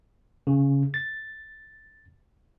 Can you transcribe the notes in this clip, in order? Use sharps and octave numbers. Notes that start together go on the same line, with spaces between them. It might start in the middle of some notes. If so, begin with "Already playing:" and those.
C#3
A6